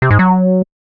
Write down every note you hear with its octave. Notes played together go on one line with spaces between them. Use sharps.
C3
G#2
F#3